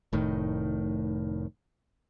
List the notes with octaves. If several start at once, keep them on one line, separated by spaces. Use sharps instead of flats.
F1 A2 D#3